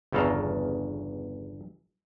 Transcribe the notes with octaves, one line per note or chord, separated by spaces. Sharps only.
G1 E2 C#3 A4 F5 A#5